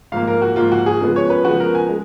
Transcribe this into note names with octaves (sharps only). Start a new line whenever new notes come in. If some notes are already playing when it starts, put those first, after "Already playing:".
G#2 F3 A#3 F5
A#4
F#4
G#2 F3 A#3 F4
F#4
G#4
C#3 F3 G#3 B3
C#5
B4
C#3 F3 G#3 B3 F#4
A#4
G#5
G#3